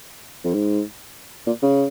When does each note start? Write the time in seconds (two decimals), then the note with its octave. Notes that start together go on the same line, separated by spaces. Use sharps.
0.44 F2
0.54 G#2
1.47 A#2
1.63 C#3